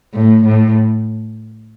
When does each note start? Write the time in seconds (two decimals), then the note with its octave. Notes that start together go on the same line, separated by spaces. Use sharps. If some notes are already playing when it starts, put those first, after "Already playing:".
0.14 A2
0.45 A2